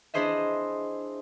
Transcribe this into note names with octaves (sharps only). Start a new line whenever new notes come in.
D4 E4 G#4 C5 D#5 E5